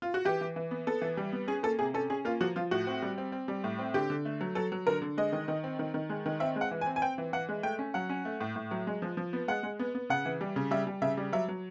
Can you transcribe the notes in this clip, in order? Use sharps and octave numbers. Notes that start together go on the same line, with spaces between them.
F4
F#4
E3 G4
E3
E3
B3
B3 A4
E3
G3
B3
C#4 G#4
A#3 A4
C3 G#4
C#4 A4
C#4 G#4
A#3 F4
F3 F#4
F3 F4
A2 F#4
C4
G3
C4
C4
G3
A2
C4
D3 G4
D3
A3
F#3
F#3 A4
F#3
D3 A#4
D3
G#3 D#5
D#3
D#3
C4
D#3
D#3
G#3
D#3
C4 E5
G#3
F#5
E3
G#5
C4
G#5
C4 G5
E3
E3 F#5
G#3
A3 G5
C#4
F#3 F#5
C#4
A3
A2
A2
F#3
G#3
F3
F3
B3
G#3 F#5
G#3
B3
B3
C#3 F#5
E3
G3
C#3
G3 E5
G3
C#3 E5
G3
F#3 E5
F#3